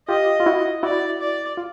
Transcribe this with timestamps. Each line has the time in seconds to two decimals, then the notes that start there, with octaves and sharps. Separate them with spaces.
0.08 F4 G4 D#5
0.40 F4
0.46 E4 F#4
0.83 E4 F#4 D5
1.21 D5
1.57 F4